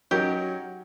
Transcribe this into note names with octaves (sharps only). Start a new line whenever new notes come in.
F#3 C#4 D#4 G4 A#4